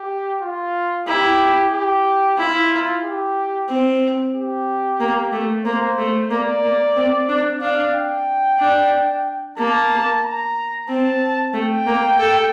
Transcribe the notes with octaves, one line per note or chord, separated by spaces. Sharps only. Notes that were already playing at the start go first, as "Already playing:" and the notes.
Already playing: G4
F4
E4 G4
G4
E4 F4
G4
C4
G4
A#3
A3
A#3 C5
A3
A#3 D5
A#3
C4
D4
D4 F5
G5
D4
A#3 A5
A#5
C4 A5
A3 G5
A#3
A4